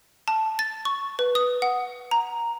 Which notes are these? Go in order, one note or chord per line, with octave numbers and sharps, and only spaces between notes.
A5
A6
C#6
B4
D#6
F#5
A#5